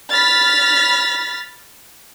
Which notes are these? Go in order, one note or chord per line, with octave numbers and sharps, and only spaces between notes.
B5 F6 A6 B6